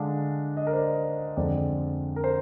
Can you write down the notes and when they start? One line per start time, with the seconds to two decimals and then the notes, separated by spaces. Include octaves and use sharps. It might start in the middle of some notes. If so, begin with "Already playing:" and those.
Already playing: D3 G#3 D4 F5
0.57 D#5
0.67 A#4
0.73 C5
0.77 D5
1.37 F2 D3 G#3 C4 D5
2.16 A#4
2.24 C5